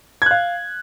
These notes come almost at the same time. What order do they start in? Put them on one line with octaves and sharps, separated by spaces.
G#6 F#6 F5